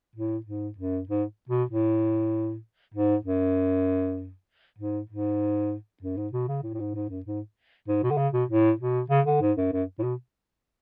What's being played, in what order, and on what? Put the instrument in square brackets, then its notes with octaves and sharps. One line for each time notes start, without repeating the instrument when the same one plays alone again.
[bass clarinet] A2
G#2
F#2
G#2
B2
A2
G#2
F#2
G#2
G#2
F#2
G#2
B2
C#3
A2
A2
G#2
G#2
F#2
G#2
G#2
B2
D3
C#3
B2
A2
B2
C#3
D3
G#2
F#2
F#2
A2
B2